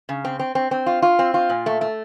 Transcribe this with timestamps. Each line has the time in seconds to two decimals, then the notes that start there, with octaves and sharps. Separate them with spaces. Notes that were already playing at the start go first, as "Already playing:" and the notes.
0.09 C#3
0.25 C4
0.39 C4
0.55 C4
0.71 C4
0.86 F4
1.02 F4
1.19 C4
1.34 F4
1.49 A#2
1.66 A3
1.81 A3